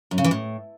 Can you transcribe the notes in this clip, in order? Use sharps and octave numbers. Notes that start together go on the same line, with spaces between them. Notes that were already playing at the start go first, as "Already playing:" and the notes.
F#2
C#3
E3
A2